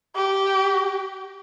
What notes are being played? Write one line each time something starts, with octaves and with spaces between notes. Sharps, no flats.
G4